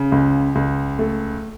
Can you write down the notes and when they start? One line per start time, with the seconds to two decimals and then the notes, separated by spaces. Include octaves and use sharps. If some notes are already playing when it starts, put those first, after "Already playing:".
Already playing: C#3
0.12 C#2
0.55 C#2
0.99 A3